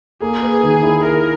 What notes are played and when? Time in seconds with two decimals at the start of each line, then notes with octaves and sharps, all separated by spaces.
0.22 A#3 G#4
0.42 B4
0.63 D#3
0.83 E4
1.03 E4 A#4